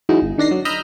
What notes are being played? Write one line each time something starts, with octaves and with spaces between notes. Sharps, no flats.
E3 F#3 G#3 D#4
G1
D#3 D4 A#6 C7
F#3
D#5 A#5 B5 E6 F6 G6